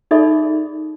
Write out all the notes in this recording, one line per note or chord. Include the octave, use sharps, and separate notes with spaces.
D#4 G#4 A4 D5 E5 B5